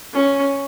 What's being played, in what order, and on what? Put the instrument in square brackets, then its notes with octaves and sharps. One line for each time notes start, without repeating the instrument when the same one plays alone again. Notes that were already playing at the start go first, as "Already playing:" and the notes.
[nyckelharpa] C#4